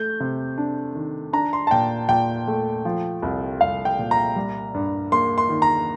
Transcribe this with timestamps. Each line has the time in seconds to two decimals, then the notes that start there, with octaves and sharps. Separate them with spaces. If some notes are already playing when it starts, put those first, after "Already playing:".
Already playing: A3 G6
0.20 C3
0.58 D4
0.95 D#3
1.33 D4 A#5
1.53 C6
1.67 A5
1.71 A#2 G5
2.09 A#2 G5
2.48 A3
2.85 F3
3.22 C2
3.61 C2 F5
3.85 G5
3.99 A#2
4.11 A#5
4.36 G3
4.74 G2
5.12 A#3 C6
5.38 C6
5.50 D#3
5.62 A#5